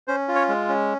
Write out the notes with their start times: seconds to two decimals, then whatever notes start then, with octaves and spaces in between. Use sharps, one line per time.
0.08 C#4 C5
0.28 F4
0.35 C#5
0.48 G#3
0.69 C#4